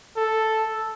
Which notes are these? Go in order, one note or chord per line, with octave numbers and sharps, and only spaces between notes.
A4